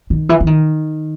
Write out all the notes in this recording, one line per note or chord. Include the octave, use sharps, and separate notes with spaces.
D#3
E3
E3
D#3